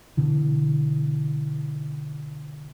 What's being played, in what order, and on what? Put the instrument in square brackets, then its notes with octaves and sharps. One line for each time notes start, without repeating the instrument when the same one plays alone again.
[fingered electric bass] B2 D3 E3